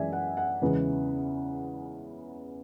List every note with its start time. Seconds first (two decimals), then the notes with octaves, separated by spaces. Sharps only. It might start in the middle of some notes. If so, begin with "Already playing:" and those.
Already playing: F#2 E3 G#3 D5 E5 G#5
0.13 F#5
0.37 F#5
0.62 E2 C#3 E3 G#3